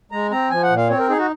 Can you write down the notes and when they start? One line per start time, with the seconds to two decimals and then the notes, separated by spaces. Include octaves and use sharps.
0.12 G#3 A#5
0.31 C4 A#5
0.50 F3 G#5
0.63 F#5
0.70 A#2
0.77 F5
0.89 C4 C#5
0.99 A#4
1.09 D#4 G#4
1.18 F#4